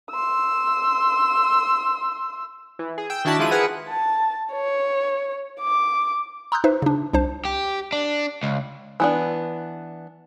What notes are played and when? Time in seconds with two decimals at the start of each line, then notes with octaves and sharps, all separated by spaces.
0.10 C6 E6
2.79 E3
2.98 G#4
3.10 G5 E6
3.25 D#3 D4 E4 F#4 A5 B5
3.39 F3 G#3 E4 F4 D#7
3.51 E4 G#4 A#4 B4 F#5 G#5
3.89 A5
4.53 C#5
5.61 D6
6.52 A#5 C6 D#6 E6 F#6 G6
6.64 D#4 B4 C5 E5
6.82 C#3 D4
7.13 C2 D4 C5 A5
7.45 G4
7.92 D4
8.43 C#2
9.00 E3 B3 D4